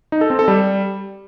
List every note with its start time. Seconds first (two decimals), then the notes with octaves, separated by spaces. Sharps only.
0.12 D#4
0.21 A4
0.30 C4
0.39 A4
0.48 G3